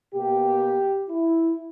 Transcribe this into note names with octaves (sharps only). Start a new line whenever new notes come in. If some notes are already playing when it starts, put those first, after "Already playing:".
B2 A#3 G4
E4